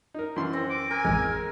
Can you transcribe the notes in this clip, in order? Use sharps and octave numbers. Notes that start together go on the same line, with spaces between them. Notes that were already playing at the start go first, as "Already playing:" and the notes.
D#4 A#4
F#2 E3 C6
C4
D6
A#4 G#5
A1 F2 G#3 A#4